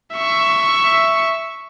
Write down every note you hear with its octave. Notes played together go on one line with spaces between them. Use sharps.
E5 C#6